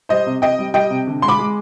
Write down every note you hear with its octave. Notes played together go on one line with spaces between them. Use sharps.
G3 C5 D#5
C3
C3 D#5 G5
G3
G3 D#5 G5
C3
D3
G#3 C6
B5 D6
G#3